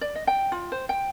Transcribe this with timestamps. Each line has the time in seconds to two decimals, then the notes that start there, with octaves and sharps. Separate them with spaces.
0.01 D5
0.15 D#5
0.27 G5
0.52 F4
0.72 C5
0.89 G5